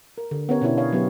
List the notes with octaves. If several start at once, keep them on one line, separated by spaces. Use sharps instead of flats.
A#4
D3
B3 C#4 G4 A#4 C#5
B2 C#4 D4 E4 C#5
C#5 D#5 F5
F#3 B3 G4 D#5